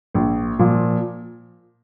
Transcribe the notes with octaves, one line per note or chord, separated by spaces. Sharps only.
A#1
A#2 F3